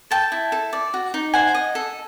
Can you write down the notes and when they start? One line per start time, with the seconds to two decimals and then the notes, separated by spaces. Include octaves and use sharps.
0.11 A4 G5 A5
0.32 E4
0.52 A4
0.73 D5
0.94 F#4
1.14 D#4
1.34 C5 F#5 G#5
1.55 D#5
1.75 A4